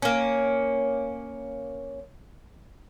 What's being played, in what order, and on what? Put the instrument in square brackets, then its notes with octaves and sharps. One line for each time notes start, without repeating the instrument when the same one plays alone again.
[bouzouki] A#3 C#4